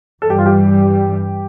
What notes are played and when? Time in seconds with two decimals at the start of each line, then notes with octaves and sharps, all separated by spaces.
0.22 G2 E3 G3 A4
0.30 G4
0.38 F4
0.46 G4